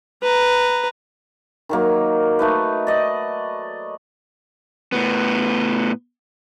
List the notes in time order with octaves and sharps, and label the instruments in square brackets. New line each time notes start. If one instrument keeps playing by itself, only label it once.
[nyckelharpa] B4 A#5
[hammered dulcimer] D#3 F#3 A#3
A3 D#4 B4
D5 D#5
[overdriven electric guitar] A2 B3